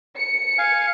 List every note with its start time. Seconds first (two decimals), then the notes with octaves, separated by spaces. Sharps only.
0.18 C#7
0.58 F5 G#5